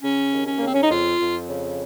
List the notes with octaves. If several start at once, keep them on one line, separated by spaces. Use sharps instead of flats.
C#3 C#4
D#2
C#4
A#3
C#3 C4
C#4
D#4
F2 F4
F2
C#3